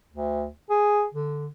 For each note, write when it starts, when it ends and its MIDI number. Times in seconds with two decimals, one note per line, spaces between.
0.10 0.50 38
0.70 1.05 68
1.14 1.47 50